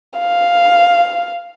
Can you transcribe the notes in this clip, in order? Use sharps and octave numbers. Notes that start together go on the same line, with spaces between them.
F5